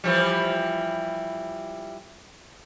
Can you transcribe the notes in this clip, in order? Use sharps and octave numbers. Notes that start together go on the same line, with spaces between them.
E3 F3 G3